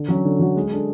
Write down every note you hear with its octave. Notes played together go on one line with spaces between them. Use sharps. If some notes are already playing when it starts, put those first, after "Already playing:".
Already playing: D3
F#3 C#4 F#4
D3
F#3 C#4 F#4
G#3
D4 A4